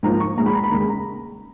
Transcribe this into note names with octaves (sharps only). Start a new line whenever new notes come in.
G#2 F3 A#3 A#5
C#6
A#2 G#3 A#5
B5
A#5
B5
D#2 C#3 G#3 A#5
B5
A#5